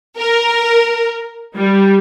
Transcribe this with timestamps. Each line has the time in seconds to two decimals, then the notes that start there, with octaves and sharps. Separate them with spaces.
0.18 A#4
1.54 G3